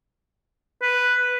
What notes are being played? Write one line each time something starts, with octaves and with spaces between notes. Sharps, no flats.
B4